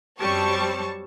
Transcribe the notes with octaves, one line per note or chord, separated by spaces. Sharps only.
F#2 G3 C4 C#5 A5 C#6